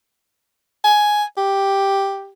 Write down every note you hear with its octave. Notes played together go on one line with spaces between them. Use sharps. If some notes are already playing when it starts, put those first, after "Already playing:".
G#5
G4